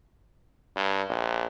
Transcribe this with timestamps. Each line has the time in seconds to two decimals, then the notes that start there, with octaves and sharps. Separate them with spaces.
0.77 G2
1.10 A#1